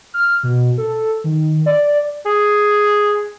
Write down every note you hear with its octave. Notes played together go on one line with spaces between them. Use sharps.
F6
B2
A4
D#3
D5
G#4